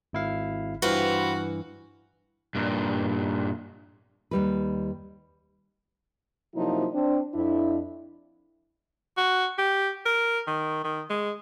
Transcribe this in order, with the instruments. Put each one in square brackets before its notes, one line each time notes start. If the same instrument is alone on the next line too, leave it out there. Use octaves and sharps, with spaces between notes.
[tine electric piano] G#1 E4 F5
[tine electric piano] G2 E3 [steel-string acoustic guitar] C4 F4 B4 [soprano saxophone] F#4
[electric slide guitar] G2 A#2
[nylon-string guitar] D#2 G3 B4
[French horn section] C3 F3 F#3 A#3 D#4 E4
C4 D4
F2 D4 E4
[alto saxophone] F#4
G4
A#4
D#3
D#3
G#3